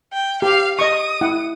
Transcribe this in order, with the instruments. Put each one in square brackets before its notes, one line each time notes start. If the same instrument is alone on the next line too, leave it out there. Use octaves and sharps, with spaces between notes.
[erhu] G5
[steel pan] G4 [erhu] F5
[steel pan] D#5 C#6 [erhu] D#6
[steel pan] E4 F#5